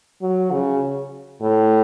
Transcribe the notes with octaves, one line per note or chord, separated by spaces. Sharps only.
F#3
C#3
A2